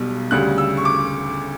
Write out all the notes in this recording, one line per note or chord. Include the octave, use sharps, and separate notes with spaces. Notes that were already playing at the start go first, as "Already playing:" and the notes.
Already playing: B1 B2 G3
D2 C#3 G3 F#6
E6
C#6
D6